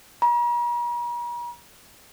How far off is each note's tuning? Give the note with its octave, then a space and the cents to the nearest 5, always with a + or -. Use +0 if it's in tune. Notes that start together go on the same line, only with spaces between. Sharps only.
A#5 +45